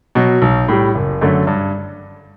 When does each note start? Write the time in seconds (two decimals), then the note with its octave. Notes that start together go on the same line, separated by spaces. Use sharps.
0.15 B2 F#3
0.42 B1
0.68 A2 G3
0.95 F#1
1.21 F#2 D3 A3
1.47 G2